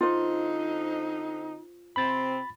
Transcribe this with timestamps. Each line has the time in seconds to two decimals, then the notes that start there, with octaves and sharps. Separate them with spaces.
0.01 D3 C4 D#4 F4 C5
1.96 C3 C4 B5 A6